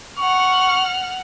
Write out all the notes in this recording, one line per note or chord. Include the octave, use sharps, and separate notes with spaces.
F#5 C#6 F6